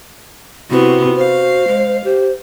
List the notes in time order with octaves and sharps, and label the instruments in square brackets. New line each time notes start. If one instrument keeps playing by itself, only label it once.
[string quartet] C3 B3 [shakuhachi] E4 [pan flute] F#4
[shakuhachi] C5 [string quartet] F5
[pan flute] G#3
[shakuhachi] G4 [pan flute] C5